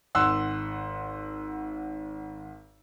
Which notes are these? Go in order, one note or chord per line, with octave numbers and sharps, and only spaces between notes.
G#1 F#5 C6 E6 F#6